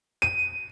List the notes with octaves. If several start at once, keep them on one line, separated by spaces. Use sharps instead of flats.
D#7